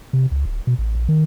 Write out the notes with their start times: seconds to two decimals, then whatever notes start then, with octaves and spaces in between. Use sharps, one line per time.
0.13 C3
0.31 C#2
0.45 D1
0.67 B2
0.79 A1
0.95 A#1
1.09 D#3